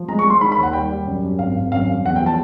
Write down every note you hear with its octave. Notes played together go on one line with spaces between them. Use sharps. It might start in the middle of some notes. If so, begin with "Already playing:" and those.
Already playing: F3
G#3 A#5
C#6
G#3
C6
D#3 B5
B5
D#2
F#5
G3 G5
G3
F#2
F#2
G#1 F5
G#1
F#2 F5
G3
E2 F#5
G5
F3 A5